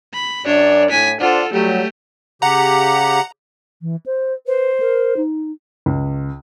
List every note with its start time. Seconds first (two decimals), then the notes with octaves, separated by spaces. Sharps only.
0.14 B5
0.46 F#2 D4 C#5 D5
0.90 A2 G#5 B6
1.20 D4 F4 A4 C5 F#5
1.53 F#3 G3 A3 G4
2.42 C#3 G4 F#5 A#5
3.81 E3
4.06 C5
4.46 B4 C5
4.80 A#4
5.17 D#4
5.86 C#2